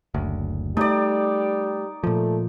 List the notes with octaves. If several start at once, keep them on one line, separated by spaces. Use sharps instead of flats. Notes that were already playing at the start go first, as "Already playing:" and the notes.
F#1 D2
G3 A3 D#4 D5
A#2 F3 A3